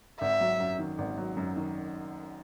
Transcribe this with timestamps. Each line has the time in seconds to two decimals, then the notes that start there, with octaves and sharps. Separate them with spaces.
0.21 G#1 E5
0.41 F#3
0.60 F#2
0.79 D#3
0.98 G#1
1.18 F#3
1.37 F#2
1.56 D#3